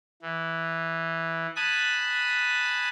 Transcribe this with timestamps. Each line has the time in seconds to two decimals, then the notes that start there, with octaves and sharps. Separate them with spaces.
0.22 E3
1.56 G#5 A5 B5 D#6 F#6